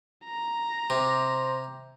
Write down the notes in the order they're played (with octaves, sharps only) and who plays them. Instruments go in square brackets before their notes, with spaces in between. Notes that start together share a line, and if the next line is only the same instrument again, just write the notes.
[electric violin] A#5
[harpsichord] C3 [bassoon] C5